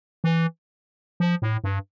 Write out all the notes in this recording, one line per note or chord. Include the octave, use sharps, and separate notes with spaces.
E3
F3
A2
G2